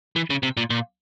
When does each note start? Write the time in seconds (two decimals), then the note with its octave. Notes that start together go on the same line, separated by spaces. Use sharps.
0.16 E3
0.30 C#3
0.43 C3
0.57 A#2
0.70 A#2